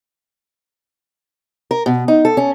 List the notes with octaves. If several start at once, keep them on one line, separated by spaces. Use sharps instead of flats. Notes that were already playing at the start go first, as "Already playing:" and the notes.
A#4
B2
D#4
A4
C#4